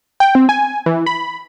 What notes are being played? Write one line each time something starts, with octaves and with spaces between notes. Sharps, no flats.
G5
C4
G#5
E3
B5